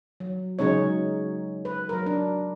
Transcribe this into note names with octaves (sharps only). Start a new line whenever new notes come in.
F#3
C#3 F#3 G#3 C#4 D#4 C#5
B4
F#3 A#4
D4